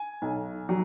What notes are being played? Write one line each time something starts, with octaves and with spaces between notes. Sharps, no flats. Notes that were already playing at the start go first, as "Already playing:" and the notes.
Already playing: G#5
B1
F#3